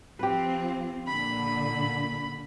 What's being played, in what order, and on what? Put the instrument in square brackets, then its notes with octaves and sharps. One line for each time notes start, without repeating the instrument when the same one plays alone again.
[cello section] F3 C4 F4 [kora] G4 B4
[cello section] A#2 D3 [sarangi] B5